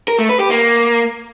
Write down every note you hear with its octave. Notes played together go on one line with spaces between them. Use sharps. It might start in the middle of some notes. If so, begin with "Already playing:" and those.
A#4
A3
B4
G4
A#3